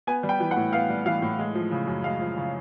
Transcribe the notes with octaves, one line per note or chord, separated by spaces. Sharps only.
B3 G#5
G3
G5
E3
F#5
A2
B3 F5
G3
E3 F5
A2
G#3
F3
C#3
F#2
G#3 F5
F3
C#3